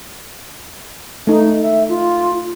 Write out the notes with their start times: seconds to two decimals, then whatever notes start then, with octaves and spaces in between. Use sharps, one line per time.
1.27 A3 D#4
1.62 E5
1.89 F4